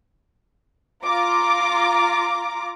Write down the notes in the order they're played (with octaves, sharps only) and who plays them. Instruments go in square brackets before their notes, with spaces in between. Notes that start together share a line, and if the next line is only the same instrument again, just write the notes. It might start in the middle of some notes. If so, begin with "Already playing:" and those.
[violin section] F4 A#5 D6